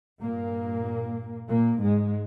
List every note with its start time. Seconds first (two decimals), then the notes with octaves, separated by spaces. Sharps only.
0.20 G2 A#2 A#3
1.49 A#2 A#3
1.82 G#2 G#3